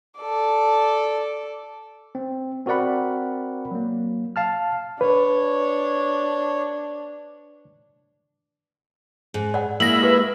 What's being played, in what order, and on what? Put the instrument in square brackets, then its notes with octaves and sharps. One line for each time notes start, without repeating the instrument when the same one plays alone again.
[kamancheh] A4 D5
[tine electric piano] C4
C4 F#4 A#4 D5 F#5 B5
F#3 A#3
F5 A5 F6
[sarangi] D4 [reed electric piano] B4 [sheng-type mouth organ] C#5
[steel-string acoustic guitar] G#2
[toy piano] D5 F#5
[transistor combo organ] G#3 E4 E5 [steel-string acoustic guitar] A#3 [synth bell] A#6 F#7
[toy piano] G4 B4